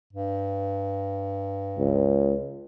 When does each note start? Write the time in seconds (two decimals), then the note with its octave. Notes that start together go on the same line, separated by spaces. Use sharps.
0.13 G2
1.79 C#2